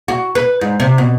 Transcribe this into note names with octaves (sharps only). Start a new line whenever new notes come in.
F#4
B4
G#2
C3
B2